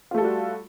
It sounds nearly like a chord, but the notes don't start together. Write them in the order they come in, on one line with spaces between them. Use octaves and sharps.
F4 A3 A4 G3 F#4